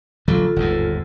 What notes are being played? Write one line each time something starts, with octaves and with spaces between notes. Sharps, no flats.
A#1 D3 F#3 F4 A4
G1 D#2 G#2